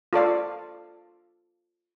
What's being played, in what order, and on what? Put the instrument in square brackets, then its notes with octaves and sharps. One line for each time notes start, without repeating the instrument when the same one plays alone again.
[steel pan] F4 A4 D5 F5